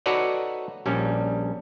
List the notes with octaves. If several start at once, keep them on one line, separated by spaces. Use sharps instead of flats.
D#4 F#4 A4 B4 C#5 D5
A#1 G3 C#4